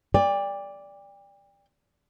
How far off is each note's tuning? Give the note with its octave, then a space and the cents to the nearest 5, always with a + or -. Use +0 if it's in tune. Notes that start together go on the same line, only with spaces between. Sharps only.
D5 -5 G5 +35